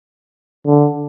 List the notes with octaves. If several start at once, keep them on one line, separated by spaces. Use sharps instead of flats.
D3